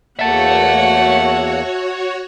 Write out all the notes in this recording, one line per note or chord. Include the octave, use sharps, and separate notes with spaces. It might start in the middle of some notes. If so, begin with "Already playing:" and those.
E2 A#3 F#4 C#5 E5 F#5 A5